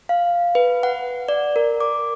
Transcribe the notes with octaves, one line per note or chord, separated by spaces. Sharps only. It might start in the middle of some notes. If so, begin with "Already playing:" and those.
F5
B4
F#5
D5
A#4
D6